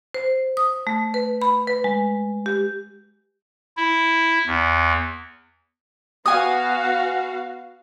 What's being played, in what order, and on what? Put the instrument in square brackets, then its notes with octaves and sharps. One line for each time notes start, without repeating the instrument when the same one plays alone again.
[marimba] C5
D#6
A3
B4
B5
B4
G#3
G4
[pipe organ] E4
E2
[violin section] B3 F#4 F5 [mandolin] G#5 D#6